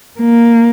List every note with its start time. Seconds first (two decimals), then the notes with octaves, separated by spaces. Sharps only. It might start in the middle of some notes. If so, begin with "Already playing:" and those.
0.20 A#3